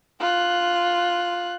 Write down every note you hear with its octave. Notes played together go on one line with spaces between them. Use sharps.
F4 F#6